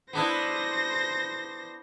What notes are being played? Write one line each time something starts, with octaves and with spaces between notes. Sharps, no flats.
B3 D4 E4 C5 A#6